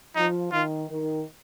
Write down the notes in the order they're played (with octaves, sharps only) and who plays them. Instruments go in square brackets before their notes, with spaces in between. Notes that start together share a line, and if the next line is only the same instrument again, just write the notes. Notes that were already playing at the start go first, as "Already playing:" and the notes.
[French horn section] F3 [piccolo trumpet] D#4
[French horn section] D#3 [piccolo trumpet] F4
[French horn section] D#3